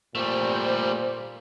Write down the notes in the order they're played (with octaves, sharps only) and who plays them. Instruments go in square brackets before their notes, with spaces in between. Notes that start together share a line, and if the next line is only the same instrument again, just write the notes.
[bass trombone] A#2 [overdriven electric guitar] G3 A3 [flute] C5